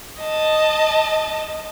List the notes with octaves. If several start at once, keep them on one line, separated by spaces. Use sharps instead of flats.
D#5 A5